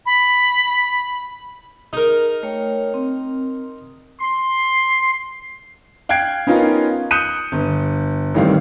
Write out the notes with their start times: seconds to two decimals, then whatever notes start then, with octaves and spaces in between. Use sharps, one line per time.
0.05 B5
1.93 D#4 G#4 A#4 D#5
2.43 A3 C#5 G5
2.94 C4
4.20 C6
6.09 F5 G5 F#6 G#6 C7 D7
6.47 B3 C#4 D#4 F4 A#4
7.11 D#6 F#6 G6 C#7 D#7 E7
7.52 G1
8.34 A1 A2 D#3 G3 C4 F5